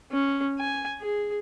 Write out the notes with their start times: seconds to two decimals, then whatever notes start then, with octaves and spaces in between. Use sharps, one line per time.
0.12 C#4
0.60 G#5
1.01 G#4